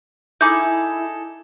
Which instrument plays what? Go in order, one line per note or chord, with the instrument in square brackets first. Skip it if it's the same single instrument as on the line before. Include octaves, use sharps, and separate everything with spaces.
[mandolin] D#4 G#4 A4 [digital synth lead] E4 [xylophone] D6 G6